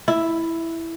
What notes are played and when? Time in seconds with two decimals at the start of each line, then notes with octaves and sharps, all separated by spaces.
0.08 E4